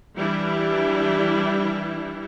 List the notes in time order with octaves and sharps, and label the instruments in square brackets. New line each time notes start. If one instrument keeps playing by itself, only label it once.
[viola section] E3 G3 D4 E4